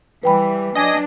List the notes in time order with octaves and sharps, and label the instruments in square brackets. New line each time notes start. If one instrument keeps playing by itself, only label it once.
[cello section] E3 G3 [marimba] B4 G5 B5
[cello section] F#3 D4 [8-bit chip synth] D#5 G#5 A#6